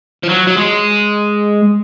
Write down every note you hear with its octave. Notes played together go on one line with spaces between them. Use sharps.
F3
F#3
F#3
G#3